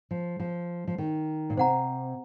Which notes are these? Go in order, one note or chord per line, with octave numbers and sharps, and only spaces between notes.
F3
F3
F3
D#3
A#2
C3 C5 F#5 A#5